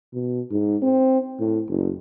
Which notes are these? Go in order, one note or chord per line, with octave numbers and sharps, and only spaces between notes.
B2
G#2
C4
A2
F#1